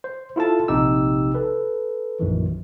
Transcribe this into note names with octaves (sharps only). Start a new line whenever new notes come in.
C5
E4 F4 A4 A5
A#1 C3 D#4 G4 E6
A4 B4
A#1 F#2 D#3 E3